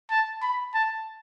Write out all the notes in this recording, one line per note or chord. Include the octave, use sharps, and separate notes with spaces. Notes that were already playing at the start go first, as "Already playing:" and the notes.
A5
B5
A5